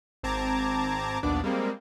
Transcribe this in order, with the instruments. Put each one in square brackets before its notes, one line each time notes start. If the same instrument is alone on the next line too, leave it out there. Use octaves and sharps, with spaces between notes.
[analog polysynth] G#1 C4 A5 A#5 D6 G#6
A#1 D#2 B2 B3 D4 D5
G3 G#3 A#3 C4